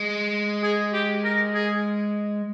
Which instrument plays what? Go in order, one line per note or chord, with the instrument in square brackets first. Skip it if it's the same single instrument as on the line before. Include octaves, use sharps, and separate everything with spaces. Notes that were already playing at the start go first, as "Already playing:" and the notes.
Already playing: [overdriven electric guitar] G#3
[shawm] G#4
G4
A#4
G#4